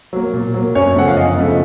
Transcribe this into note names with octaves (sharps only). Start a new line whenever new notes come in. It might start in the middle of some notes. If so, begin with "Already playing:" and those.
F#3 A#3
A#2
F#3 A#3
F#2 C#5
C#3 F3 A3 F#5
F5
F#2 D#5
C#3 F3 A3